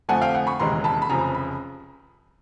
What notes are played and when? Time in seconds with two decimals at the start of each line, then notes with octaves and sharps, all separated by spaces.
0.09 F2 D3 F3 A3 D4 F#5 G#5
0.21 F5 G5
0.34 F#5 G#5
0.47 B5 C#6
0.59 E1 D#2 C#3 E3 G#3 A#5 C6
0.84 A5 B5
1.02 B5
1.10 F1 F2 C#3 F3 G#5 A#5
1.35 B5